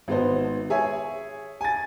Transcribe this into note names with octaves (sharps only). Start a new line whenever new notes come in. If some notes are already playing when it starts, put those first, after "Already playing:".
G#1 B3 C5
G#4 C#5 E5 G#5
G#5 A6